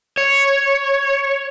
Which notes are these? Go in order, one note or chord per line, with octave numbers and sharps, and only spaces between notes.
C#5